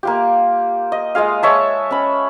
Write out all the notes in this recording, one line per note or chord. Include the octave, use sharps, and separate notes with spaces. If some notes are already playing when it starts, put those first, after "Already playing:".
A#3 F4 G4
D#5
G#3 F4 G#4 F5
G#3 C#5 E5 A5
C#4 B5